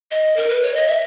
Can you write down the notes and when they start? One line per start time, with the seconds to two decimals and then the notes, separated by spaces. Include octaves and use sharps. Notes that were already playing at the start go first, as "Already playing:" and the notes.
0.11 D#5
0.36 A#4
0.49 B4
0.62 C#5
0.74 D#5
0.87 E5